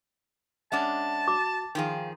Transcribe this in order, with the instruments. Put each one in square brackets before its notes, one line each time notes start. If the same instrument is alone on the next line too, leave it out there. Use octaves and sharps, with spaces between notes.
[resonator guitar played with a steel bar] G#3 C#4 D4 [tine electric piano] E5 F#5 D6 [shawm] A5
[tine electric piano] F#4 [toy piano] D6
[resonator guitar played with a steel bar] D#3 F3 G#4 [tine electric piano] F5 G5